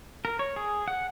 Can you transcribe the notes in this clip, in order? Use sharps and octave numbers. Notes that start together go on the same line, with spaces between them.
A#4
C#5
G#4
F#5